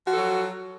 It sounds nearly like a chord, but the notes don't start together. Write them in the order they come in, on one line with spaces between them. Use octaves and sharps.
F3 F#4 A4 F#3